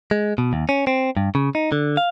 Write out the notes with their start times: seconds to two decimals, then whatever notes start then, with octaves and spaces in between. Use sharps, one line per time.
0.11 G#3
0.38 B2
0.53 D#2
0.69 C#4
0.87 C4
1.17 G2
1.35 C#3
1.55 D#4
1.72 D3
1.97 F5